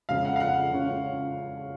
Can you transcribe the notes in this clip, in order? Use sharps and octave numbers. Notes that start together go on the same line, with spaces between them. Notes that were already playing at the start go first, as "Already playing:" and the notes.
F2 C#3 G#3 F5
F#5
F5
F#5
C#3 G#3 C#4 F4